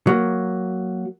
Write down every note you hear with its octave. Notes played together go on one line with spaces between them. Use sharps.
F#3 A#3